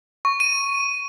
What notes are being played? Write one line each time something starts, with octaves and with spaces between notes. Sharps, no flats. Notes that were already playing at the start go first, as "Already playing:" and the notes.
C#6
D#7